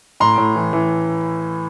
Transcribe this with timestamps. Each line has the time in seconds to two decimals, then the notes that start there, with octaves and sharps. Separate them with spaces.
0.20 A2 A#5 C6
0.38 A2
0.56 E3
0.73 E3